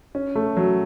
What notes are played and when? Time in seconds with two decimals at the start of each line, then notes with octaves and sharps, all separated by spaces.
0.15 C#4
0.35 A3
0.57 F#3